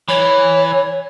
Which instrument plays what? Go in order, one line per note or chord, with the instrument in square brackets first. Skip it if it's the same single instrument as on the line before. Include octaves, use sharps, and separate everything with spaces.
[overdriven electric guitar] E3 [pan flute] C#5